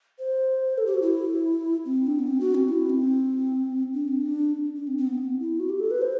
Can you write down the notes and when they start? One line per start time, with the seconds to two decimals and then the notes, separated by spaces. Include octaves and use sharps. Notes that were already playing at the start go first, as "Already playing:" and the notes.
0.19 C5
0.78 A4
0.86 G4
0.94 F#4
1.02 E4
1.85 C4
2.07 D4
2.19 B3
2.27 C4
2.41 F#4
2.55 C4
2.68 E4
2.90 C4
3.93 D4
4.08 C4
4.21 D4
4.76 D4
4.87 C4
4.97 C4
5.07 B3
5.18 C4
5.39 E4
5.60 F#4
5.69 G4
5.80 A4
5.91 B4
6.02 C5